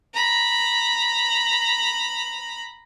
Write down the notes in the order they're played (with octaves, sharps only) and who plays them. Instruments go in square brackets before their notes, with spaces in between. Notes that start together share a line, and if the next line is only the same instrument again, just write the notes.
[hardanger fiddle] A#5 B5